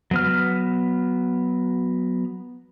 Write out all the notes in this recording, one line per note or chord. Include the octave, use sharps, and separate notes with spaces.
F#3 B3 F6